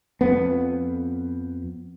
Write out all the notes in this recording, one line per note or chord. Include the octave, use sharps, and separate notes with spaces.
F2 B3